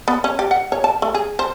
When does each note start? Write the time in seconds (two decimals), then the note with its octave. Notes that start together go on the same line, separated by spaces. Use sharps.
0.08 B3
0.24 C#4
0.39 G4
0.51 F#5
0.72 C#5
0.84 A5
1.02 A3
1.14 G#4
1.39 C5